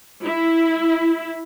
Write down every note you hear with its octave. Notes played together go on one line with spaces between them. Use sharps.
E4